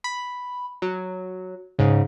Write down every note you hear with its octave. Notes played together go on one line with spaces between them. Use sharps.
B5
F#3
G#2 C#3